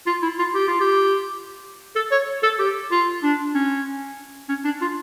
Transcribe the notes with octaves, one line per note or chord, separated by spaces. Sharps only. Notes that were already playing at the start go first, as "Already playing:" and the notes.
F4
E4
F4
G4
F4
G4
A4
C#5
A4
G4
F4
D4
C#4
C#4
D4
F4